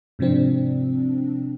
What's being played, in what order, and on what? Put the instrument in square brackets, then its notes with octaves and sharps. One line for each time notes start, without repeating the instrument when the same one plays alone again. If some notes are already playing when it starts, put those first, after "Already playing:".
[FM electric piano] G#2 C3 F3 C4 D4